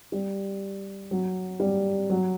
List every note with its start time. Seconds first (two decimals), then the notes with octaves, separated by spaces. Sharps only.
0.12 G3
1.11 F#3
1.60 G3
2.10 F#3